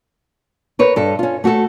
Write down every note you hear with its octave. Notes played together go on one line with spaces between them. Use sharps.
A#4 B4 C#5
G2 A4
C#4 F4
A3 F#4 G4 A4